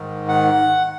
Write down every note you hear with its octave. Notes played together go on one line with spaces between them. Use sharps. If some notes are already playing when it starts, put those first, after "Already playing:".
Already playing: G#2 D#3
F#5